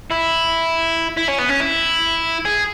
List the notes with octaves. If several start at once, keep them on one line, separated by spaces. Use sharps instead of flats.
E4
E4
C#4
B3
C#4
E4
G#4